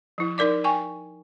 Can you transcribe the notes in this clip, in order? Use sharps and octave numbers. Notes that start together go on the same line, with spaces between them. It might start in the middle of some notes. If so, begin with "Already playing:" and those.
F3 E4
D#4 A#4 D5 D6
G5 G#5 C#6